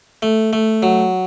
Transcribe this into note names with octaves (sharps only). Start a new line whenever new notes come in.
A3
A3
F#3